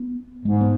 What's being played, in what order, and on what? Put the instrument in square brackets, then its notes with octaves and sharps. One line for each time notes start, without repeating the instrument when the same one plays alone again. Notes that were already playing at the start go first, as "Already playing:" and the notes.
Already playing: [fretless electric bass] B3
[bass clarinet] G#2 [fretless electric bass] G#3
[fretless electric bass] B3